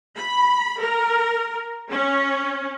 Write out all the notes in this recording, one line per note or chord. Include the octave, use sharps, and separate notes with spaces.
B5
A#4
C#4